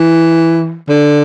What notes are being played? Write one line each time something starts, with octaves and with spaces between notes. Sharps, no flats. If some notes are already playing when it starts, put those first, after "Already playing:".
Already playing: E3
D3